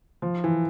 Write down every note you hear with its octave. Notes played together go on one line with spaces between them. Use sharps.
F3
E3